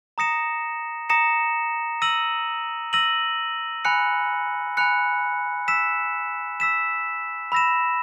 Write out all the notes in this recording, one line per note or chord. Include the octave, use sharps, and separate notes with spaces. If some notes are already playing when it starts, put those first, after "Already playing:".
A#5 D#6 A#6 C#7 E7
A#5 D#6 A#6 C#7 E7
E6 A#6 D#7 F#7
E6 A#6 D#7 F#7
G#5 B5 F#6 C#7
G#5 B5 F#6 C#7
E6 B6 E7
E6 B6 E7
B5 E6 A#6 E7